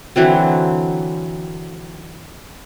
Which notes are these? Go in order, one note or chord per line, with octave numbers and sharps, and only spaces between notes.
D3 E3 F#3 C4